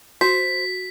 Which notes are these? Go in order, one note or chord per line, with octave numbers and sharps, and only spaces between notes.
F#4 C5 B6